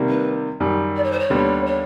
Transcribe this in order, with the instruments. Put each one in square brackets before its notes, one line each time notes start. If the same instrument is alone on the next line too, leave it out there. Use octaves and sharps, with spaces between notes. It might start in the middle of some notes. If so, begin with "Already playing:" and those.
Already playing: [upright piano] C3 D#3 G3 A#3
[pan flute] B4
[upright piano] F#2 D#3 G3
[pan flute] D5
C#5
C5
C#5
[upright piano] D#2 D3 G3 B3
[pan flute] C#5